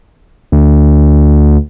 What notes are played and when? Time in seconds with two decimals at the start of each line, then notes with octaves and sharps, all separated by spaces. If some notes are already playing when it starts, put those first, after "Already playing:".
0.52 D2